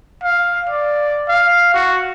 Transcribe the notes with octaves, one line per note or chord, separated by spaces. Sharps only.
F5
D5
F5
F#4